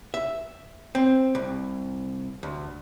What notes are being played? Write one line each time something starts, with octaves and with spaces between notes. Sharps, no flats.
E5
C4
C2
D2